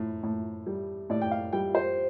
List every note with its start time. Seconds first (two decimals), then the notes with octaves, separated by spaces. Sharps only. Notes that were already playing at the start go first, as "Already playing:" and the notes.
Already playing: A2
0.23 A2
0.66 G3
1.10 A2 D5
1.22 G5
1.31 F5
1.53 G3 G5
1.75 C5